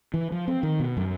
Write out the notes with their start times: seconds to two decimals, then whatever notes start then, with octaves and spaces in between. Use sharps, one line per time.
0.14 E3
0.32 F3
0.48 C4
0.63 D#3
0.80 B2
0.97 F#2